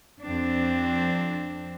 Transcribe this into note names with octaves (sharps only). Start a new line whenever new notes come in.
F2 C4 D4